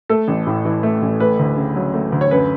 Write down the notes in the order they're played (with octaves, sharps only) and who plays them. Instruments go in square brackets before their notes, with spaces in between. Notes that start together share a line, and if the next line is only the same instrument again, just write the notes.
[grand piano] A3 A4
A1
A2
E3
A3
A1
A3 B4
D2
C#3
F#3
A3
D2
C#5
F#2 B4